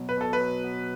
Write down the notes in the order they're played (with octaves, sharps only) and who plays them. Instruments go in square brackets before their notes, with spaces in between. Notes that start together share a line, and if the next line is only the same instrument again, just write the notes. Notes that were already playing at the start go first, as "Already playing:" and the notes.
Already playing: [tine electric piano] B2 F#3 B3
[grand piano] B4
[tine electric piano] B2 [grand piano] A4
[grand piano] B4
[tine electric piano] F#3
B3